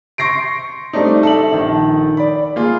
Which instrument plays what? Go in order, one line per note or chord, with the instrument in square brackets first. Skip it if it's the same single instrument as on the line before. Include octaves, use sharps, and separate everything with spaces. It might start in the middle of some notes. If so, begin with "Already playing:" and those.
[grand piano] C6 C#6 A#6 C7 D7
G3 A3 C4 D4 D#4
A4 E5 F#7
A#1 D#3
D5 B5
A#3 F4 G#4